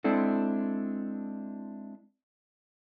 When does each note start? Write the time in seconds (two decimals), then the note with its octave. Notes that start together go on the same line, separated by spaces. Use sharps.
0.04 G#3 C4 D4 E4 A4